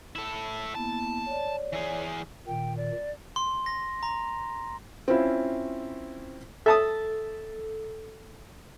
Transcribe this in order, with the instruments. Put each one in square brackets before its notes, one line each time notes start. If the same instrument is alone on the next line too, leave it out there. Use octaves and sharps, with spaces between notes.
[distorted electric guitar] E4 A4 [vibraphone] E5
[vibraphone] A#3 B3 E4 [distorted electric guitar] A5
[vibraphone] C#5 D5
[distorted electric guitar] E3 G#4
[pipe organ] A#2 D#3 [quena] G5
[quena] D5
[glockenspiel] C6
A#6
A#5
[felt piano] C4 C#4 E4 F4
[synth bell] A4 [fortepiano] E5 A5 D#6